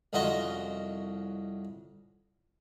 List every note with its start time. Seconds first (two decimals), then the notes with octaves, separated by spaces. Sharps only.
0.13 C2 F2 C#4 F#4 D#5 C6